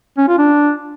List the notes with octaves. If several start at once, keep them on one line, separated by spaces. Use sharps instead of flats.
C#4
F4
D4